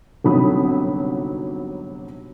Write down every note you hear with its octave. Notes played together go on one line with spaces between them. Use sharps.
G1 G#2 C3 F#3 B5 D#6